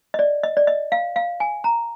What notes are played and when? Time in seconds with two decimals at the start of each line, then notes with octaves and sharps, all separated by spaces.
0.14 D#5
0.19 D5
0.43 D#5
0.57 D5
0.67 D#5
0.92 F5
1.16 F5
1.40 G#5
1.64 A#5